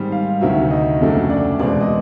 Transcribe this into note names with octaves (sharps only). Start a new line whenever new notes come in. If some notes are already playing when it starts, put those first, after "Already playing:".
Already playing: G#2 D#3 G3 C4
F5
D2 C3 D#3 F#3 E5
D#5
F2 C#3 F#3 A3 D4
D5
E2 B2 G#3 C4 D5
D#5